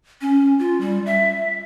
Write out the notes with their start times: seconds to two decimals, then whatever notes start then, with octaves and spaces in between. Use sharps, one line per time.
0.21 C#4
0.59 F4
0.81 G3
1.06 E5